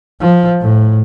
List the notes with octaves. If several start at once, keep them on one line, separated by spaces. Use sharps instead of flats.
F3
A2